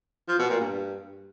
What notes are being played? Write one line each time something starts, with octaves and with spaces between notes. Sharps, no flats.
F3
B2
A#2
G2